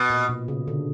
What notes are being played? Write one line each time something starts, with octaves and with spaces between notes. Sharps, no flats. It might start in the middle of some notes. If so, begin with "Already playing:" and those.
Already playing: B2
A#2
B2
C#3
D3